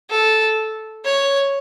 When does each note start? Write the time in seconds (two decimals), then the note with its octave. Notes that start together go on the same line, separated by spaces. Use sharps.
0.10 A4
1.05 C#5